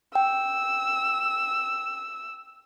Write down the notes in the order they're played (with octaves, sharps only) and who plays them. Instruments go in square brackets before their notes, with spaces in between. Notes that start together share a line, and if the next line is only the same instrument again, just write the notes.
[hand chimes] G5 [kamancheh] E6